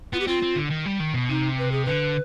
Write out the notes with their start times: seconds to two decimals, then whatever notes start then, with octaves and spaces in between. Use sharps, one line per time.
0.13 B3 F4
0.20 G4
0.27 C4 F4
0.42 C4
0.56 D3
0.71 D#3
0.86 G3
1.00 D#3
1.14 B2
1.29 C3 D#4
1.58 B4
1.72 G#4
1.85 D3 B4